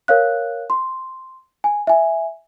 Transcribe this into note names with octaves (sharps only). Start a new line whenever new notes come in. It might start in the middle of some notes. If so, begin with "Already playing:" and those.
A#4 C#5 F5 F#6
C6
G#5
E5 G#5